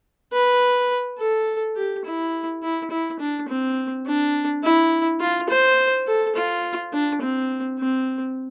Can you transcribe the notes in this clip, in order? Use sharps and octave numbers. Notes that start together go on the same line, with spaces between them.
B4
A4
G4
E4
E4
E4
D4
C4
D4
E4
F4
C5
A4
F4
D4
C4
C4